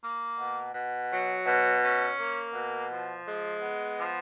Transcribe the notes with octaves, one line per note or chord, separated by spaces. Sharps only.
A#3
B2
B2
F#3
B2
C#4
A#3
B2
F3
G#3
B3
F3